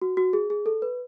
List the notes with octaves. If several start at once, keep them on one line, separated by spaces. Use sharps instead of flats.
F#4
F#4
G#4
G#4
A4
B4